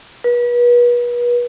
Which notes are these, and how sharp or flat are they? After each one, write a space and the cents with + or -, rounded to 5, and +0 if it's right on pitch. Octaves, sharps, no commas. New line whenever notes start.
B4 -35